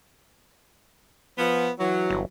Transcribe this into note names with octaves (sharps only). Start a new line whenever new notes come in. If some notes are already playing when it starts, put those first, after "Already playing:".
F3 B3
E3 F#3
G1